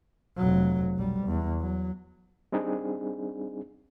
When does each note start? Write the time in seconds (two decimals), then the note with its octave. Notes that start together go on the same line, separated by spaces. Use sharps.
0.37 F1 F#3
0.96 B1 G3
1.25 E2
1.60 F#3
2.52 G3 C4 D4 D#4 G#4